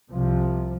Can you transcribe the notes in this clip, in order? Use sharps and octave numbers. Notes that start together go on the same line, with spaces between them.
C2 C3 F3